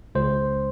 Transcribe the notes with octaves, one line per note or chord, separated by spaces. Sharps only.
C#2 C5